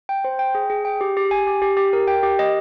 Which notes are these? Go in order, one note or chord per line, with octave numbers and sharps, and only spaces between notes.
G5
C5
G5
G#4
G#4
G5
G4
G4
G#5
G4
G4
G4
A#4
G5
G4
D#5